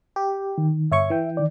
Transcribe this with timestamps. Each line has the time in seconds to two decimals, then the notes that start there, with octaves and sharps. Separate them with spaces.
0.16 G4
0.58 D#3
0.92 G1 C#5 E5 C#6
1.10 E3 G5
1.37 D#3 D5